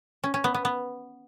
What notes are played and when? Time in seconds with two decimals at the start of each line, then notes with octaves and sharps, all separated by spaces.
0.24 C#4
0.34 C#4
0.44 B3
0.54 B3
0.65 B3